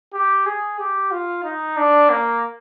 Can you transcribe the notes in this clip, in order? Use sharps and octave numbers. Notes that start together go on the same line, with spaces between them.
G4
G#4
G4
F4
D#4
D4
A#3